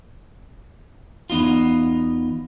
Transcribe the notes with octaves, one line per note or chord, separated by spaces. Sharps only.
E2 B3 D#4 F4